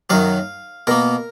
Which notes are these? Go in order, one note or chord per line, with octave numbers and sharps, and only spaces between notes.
F#2 D#3 F#3 F5
B2 A#3 A#4